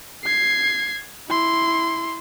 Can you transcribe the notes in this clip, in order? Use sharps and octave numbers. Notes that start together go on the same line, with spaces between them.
G#6 C7
E4 C6